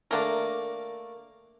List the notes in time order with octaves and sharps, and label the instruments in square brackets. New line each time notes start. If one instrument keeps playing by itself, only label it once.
[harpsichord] A3 A#3 [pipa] D4 A#4